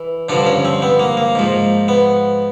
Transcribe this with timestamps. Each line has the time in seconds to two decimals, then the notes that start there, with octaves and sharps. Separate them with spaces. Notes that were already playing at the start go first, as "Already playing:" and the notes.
Already playing: E3
0.29 G2 D3 F3 D4
0.46 C#4
0.65 C4
0.82 B3
1.00 A#3
1.17 A#3
1.35 G#2 F3
1.88 B3